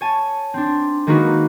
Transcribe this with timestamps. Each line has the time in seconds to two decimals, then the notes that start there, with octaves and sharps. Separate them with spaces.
0.01 C#5 G#5 A5
0.54 C4 D4
1.07 D#3 G#3 A#3 D#4 F#4 B4